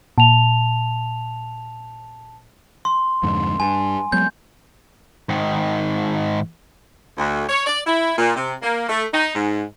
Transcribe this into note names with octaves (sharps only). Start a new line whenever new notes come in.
A#2 A5 F7
C6
F2 G#2 D3
G2 G#5
F#3 G#3 B3 G6
G#2 D#3
D2
C#5
D5
E4
A#2
C3
A#3
A3
D#4
G#2